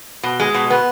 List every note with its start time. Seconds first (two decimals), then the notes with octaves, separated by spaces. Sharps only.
0.23 B2
0.40 G#3
0.54 B2
0.70 B3